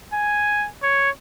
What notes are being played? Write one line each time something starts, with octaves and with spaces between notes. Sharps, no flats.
G#5
C#5